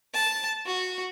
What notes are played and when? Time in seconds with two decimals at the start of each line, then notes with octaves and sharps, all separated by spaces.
0.14 A5
0.66 F#4